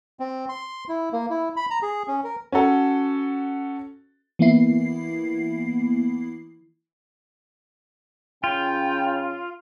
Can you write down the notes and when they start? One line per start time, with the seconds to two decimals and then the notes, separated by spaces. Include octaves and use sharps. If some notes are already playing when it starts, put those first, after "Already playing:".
0.20 C4
0.49 C6
0.89 E4
1.12 A#3
1.30 E4
1.56 B5
1.70 A#5
1.83 G#4
2.08 C#4
2.24 A#4
2.52 C#4 F#4 A4
4.39 E3 A#3 B3 E4 C7
8.44 C#3 F4 G5